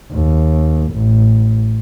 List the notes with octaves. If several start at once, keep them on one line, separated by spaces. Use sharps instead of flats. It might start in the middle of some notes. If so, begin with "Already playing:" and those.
D#2
A1